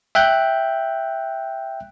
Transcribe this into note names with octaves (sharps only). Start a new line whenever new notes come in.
E5 G5 F#6 G6